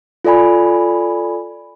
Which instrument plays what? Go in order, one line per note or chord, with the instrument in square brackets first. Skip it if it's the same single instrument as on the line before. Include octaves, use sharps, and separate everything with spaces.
[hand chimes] F4 A4 D5 G#5 B5